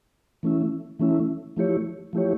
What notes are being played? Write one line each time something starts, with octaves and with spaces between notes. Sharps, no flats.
E3 A3 C#4 E4
E3 A3 C#4 E4
F3 A3 E4 G4 C#5
F3 A3 E4 G4 C#5